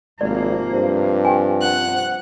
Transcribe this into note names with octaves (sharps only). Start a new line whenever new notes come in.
G#1 C3 F3 A#3 D5
G2 C5
G4 G5 G#5
F#5 F#6